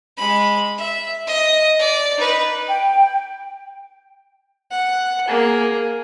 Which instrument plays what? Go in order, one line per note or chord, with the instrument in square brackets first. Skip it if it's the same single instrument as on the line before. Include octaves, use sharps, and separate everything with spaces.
[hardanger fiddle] G#3 B5
E5
D#5
D5
D#4 B4
[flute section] G5
[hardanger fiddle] F#5
A#3 G#4